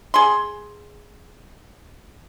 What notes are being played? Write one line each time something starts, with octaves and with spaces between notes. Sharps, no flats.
G#4 C6